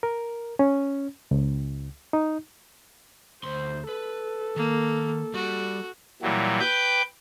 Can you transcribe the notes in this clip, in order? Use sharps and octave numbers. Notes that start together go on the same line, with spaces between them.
A#4
C#4
C#2
D#4
D2 C5 C6
A4 B4
D#3 A#3
G3 F#4
A#2 E3 F#3 G3
B4 G5 D6 G6